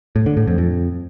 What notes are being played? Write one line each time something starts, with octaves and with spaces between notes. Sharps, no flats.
A2
D3
A2
F2
F2